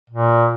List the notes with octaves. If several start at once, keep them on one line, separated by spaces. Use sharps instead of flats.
A#2